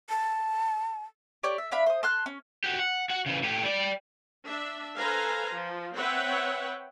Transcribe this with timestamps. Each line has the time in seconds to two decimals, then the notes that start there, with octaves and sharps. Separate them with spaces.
0.10 A5
1.43 G4 C#5 D5
1.58 E5
1.71 D4 E5 F5 B5
1.86 C5 D#6
2.03 A5 C6 F6 F#6
2.26 C#4
2.64 F#4 G4
2.80 F#5
3.10 F#4 F#5
3.26 C#3 E3
3.43 A2 G4
3.63 G3 D5
4.46 D4 E5
4.97 A4 B4 C5 F5 G#5 A#5
5.51 F3
5.94 C4 B4 C#5 E5 F#5 G5